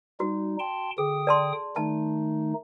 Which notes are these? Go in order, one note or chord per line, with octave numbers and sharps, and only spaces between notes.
G3 D#4 F#4
G5 A5 C6
D3 G#4 G5 D#6
D5 A5 C6
D#3 A3 D#4 A5